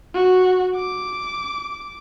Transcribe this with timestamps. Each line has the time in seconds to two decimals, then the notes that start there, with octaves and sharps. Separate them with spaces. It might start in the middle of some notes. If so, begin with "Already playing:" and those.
0.14 F#4
0.75 D6